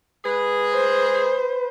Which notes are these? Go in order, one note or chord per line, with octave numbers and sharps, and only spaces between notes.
G#3 G#4 B4
C5